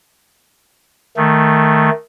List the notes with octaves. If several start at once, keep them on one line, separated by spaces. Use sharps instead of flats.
D#3 A3